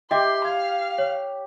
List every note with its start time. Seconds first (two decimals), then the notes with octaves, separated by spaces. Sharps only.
0.11 G4 D#5 E5 C6 D6
0.45 F5 G#6
0.98 C#5